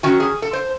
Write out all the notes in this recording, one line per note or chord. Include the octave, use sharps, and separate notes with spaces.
D#3 F#3 C#4 F#4
G#4
A4
C5